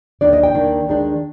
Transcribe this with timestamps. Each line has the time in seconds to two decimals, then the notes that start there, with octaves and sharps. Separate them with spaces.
0.21 D#2 D#3 A#3 D4 D5
0.33 D#5
0.43 G5
0.54 D#2 D#3 A#3 D4
0.87 D#2 D#3 G#3 D4